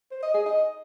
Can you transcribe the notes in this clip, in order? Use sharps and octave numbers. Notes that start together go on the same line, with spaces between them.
C5
D#5
G#4
D#5